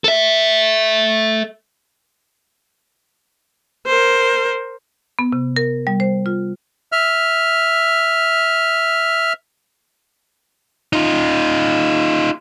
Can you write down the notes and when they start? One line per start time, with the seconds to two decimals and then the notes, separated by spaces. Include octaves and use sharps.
0.04 A4 E5
3.86 A#4 C5
5.19 B3
5.33 C3
5.56 A#4
5.87 G3
6.00 C5
6.26 F4
6.92 E5 F6
10.93 D#4 F4